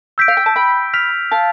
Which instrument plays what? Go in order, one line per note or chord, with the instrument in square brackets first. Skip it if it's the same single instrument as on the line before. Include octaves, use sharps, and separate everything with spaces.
[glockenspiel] E6 G6 B6 D7
[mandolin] F5
G5
A5
G5 B5
[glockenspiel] F6 B6 F7
[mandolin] F5 A5